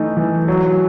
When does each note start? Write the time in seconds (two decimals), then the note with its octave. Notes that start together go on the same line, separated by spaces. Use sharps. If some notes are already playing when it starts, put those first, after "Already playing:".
Already playing: E3 A3 D#4
0.17 E3
0.48 F#3